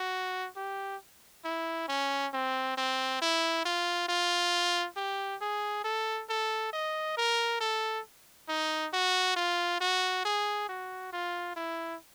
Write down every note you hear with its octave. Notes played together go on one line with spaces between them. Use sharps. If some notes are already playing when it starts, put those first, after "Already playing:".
Already playing: F#4
G4
E4
C#4
C4
C4
E4
F4
F4
G4
G#4
A4
A4
D#5
A#4
A4
D#4
F#4
F4
F#4
G#4
F#4
F4
E4